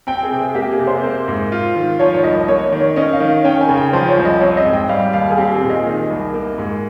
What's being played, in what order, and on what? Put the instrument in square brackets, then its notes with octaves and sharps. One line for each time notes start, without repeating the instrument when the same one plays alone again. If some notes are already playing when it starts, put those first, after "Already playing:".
[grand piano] C4 [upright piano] G5
[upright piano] G#4
[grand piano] C3
[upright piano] G#4
[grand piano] A#3 [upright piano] G4
[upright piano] G#4
[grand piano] C3
[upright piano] C5
[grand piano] A#3
G#2
F4
D#3
[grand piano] F3 [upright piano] C#5
[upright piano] C#5
[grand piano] C2 [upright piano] D#5
[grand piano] A#3 [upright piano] C#5
[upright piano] C#5
[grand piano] D#3
[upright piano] C#5
[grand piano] C#4 [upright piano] D#5
[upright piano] F5
[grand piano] D#3
[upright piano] F5
[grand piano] C#4 [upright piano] G5
[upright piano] G#5
[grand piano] C#3
[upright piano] G5
[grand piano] F3 [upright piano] C5
[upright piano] C#5
[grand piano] C2
[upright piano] D#5
[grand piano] C4 [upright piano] C#5
[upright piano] D#5
[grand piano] G#2
[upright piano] G5
[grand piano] G3 [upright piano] F5
[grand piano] D#2 [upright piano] F5
[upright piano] G#4
[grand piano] C4 [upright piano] G4
[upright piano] G#4
[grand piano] A#2
[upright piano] D#5
[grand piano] D#3
C2
A#3
G#2